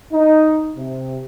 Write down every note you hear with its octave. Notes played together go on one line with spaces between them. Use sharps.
D#4
C3